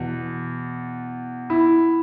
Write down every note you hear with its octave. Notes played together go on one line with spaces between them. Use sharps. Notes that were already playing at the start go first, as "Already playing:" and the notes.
Already playing: E2 B2
E4